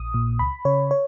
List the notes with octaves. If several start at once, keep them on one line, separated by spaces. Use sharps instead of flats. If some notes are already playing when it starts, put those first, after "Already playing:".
Already playing: A#1 D#6
A#2
C#2 B5
C#3 C#5
C#5